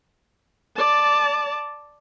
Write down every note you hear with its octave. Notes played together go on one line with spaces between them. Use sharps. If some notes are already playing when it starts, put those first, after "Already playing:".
D5 A5